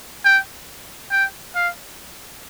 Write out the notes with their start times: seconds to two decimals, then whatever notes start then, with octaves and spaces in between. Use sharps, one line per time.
0.25 G5
1.11 G5
1.55 F5